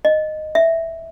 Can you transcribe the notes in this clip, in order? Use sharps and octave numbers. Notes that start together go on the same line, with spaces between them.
D#5
E5